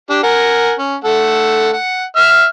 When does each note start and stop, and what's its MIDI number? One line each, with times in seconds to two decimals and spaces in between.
0.10 0.22 62
0.10 0.22 67
0.23 0.73 70
0.23 0.73 78
0.23 0.73 80
0.79 0.96 61
1.04 1.73 57
1.04 1.73 69
1.04 1.73 78
1.73 2.04 78
2.16 2.45 76
2.16 2.45 89